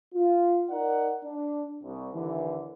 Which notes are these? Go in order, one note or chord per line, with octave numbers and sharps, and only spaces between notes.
F4
D#4 A#4 D5 F#5
D4
C2
D#2 D3 E3